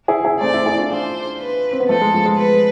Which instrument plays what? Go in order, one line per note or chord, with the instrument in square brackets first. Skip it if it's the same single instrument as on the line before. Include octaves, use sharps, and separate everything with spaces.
[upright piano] E4 G#4
E4 G#4
[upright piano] A3 C4 [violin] D5
[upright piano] C4 E4
E4 G#4
D4 F4
[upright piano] D4 F4 [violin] C5
[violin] B4
[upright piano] C4
B3
[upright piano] F3 A3 [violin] A4
[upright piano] G#3
F3
G#3
[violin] B4